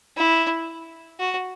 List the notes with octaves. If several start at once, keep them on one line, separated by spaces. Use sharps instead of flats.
E4
F#4